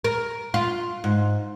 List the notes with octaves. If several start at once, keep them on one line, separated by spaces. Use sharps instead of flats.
A#4
F4
G#2